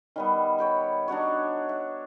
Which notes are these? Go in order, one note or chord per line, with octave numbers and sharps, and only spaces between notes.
D#3 G3 B3
C#5 G5 B5
D4 D#4 F#4 C#5
E5